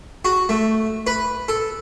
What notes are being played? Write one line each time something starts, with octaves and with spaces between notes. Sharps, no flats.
F#4
A3
B4
A4